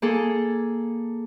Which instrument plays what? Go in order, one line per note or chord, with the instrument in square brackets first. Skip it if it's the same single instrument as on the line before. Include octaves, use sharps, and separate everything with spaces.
[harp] A#3 G#4 A4